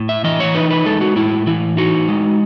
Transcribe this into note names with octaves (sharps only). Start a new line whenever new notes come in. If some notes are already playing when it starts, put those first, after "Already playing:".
Already playing: A2
E5
E3 D#5
C#5
D#4 B4
B4
G#3 A4
F#4
A2 E4
E3 E4
D#4 F#4
G#3